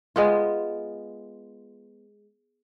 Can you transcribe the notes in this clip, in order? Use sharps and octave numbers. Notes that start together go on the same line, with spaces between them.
G#3 B3 F4